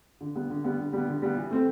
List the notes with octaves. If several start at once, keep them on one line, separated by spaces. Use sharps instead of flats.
D3
G3 B3
D3
G3 B3
D3
G3 B3
D3
G3 B3
E3
A3 C4